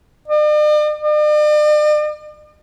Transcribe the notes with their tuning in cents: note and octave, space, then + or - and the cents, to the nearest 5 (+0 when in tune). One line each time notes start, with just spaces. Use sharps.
D5 +45
D5 +45